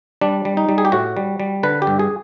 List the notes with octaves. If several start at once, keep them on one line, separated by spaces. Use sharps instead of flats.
G3 D4
G3
D#4
G3
G#4
G4
A2 F#4
G3
G3
D3 B4
G4
G2
G#4